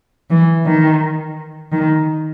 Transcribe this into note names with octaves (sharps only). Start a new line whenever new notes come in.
E3
D#3
D#3